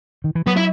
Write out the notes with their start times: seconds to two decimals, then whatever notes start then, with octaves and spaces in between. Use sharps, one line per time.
0.24 D#3
0.35 E3
0.47 F#3 B3
0.56 E4